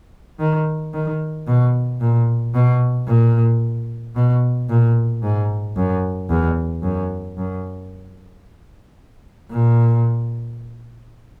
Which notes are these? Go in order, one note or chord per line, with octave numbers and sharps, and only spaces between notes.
D#3
D#3
B2
A#2
B2
A#2
B2
A#2
G#2
F#2
E2
F#2
F#2
A#2